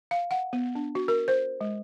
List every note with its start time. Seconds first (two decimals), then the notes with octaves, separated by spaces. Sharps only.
0.11 F5
0.31 F#5
0.53 B3
0.75 D4
0.95 F#4
1.08 A#4
1.28 C5
1.61 G#3